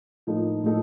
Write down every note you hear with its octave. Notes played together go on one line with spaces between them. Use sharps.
A2 F3 A#3 D#4 A4
A2 F3 A#3 D#4 A4